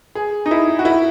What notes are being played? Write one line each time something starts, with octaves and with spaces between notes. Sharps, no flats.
G#4
D#4
E4
F#4
E4